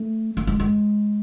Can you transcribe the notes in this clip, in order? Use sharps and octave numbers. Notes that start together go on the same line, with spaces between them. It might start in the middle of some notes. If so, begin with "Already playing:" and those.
Already playing: A3
A3
G#3
G#3